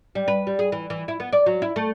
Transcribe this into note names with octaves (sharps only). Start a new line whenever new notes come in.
G3
B4
G3
G#4
E3
E3
E4
B3
D5
F#3
E4
A3